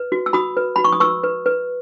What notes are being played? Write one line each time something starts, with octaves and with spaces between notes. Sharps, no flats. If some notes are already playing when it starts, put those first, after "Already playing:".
Already playing: B4
F#4
E6
F#4 B5 D#6
B4
F#4 B5
C#6
D#6
B4 C#6 E6
B4
B4